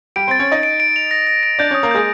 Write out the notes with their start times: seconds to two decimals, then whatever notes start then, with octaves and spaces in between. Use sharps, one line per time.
0.16 G3 G4 D7
0.28 C4 C5 A6
0.39 C#4 C#5
0.48 D#4 D#5 A6
0.63 D7
0.80 D7
0.96 F7
1.11 A#6
1.27 A#6
1.43 D7
1.59 D4 D5 G6
1.71 C#4 C#5 D#6
1.83 A#3 A#4
1.91 G#3 G#4 G6